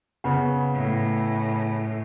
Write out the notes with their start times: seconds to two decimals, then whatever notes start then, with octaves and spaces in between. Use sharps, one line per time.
0.24 C#3 B3
0.74 A2